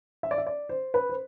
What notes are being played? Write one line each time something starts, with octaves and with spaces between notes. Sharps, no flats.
E5
D5
E5
D5
C5
B4
C5